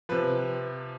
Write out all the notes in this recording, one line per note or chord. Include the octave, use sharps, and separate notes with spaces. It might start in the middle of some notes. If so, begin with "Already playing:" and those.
C3 F3 B4